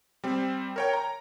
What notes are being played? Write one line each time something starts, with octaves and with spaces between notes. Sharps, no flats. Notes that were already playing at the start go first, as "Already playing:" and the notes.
G3 C4
A#4 C#5 G5
A#5